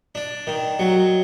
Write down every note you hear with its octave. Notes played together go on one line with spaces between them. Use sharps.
D4
D#3
F#3